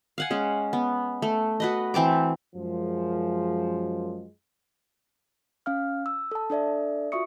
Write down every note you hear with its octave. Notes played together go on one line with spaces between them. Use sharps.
F5 F#5 G#5
G#3 C#4
B3
A3
F#4 B4 D#5
E3 C4 A5 D6
F#2 F3 G#3
C#4 F5 F6
E6
A4 A5
D4 A4 D5 E5
F4 F#4 E5 C#6 D#6 C#7